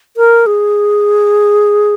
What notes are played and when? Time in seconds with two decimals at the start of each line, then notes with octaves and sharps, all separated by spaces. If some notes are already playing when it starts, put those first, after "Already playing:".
0.17 A#4
0.46 G#4